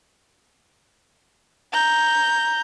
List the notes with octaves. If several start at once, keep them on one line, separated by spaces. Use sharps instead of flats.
A#5 G6